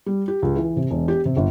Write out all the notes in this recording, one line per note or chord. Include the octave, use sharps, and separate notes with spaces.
G3
G4
C#2
E3
C3
E1
G4
C3
G1